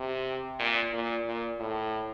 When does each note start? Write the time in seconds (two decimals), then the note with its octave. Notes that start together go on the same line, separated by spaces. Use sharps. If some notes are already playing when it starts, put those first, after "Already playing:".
Already playing: C3
0.59 A#2
0.93 A#2
1.26 A#2
1.60 A2